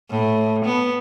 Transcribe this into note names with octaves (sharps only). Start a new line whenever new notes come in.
A2
B3